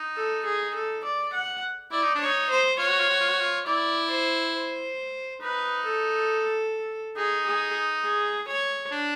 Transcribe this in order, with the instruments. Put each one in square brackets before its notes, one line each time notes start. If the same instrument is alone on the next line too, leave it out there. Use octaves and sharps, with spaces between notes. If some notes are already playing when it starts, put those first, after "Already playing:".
Already playing: [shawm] D#4
[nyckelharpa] A4
G#4
A4
D5
F#5
[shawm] E4 [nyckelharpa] D5
[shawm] D#4
D4
[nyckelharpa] C#5
[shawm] D#4
[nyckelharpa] C5
[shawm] F4 [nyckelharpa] C#5
[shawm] F#4
F4
F#4
F4
F#4
F4
[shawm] E4 [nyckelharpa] D5
[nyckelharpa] C5
C5
[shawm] D#4 [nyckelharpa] B4
[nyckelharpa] A4
[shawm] D#4 [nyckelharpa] G#4
[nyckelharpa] G#4
G#4
C#5
[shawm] D4